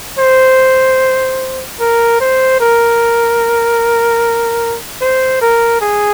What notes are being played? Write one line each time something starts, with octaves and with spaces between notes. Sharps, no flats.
C5
A#4
C5
A#4
C5
A#4
G#4